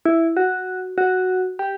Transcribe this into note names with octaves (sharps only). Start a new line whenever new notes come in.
E4
F#4
F#4
G4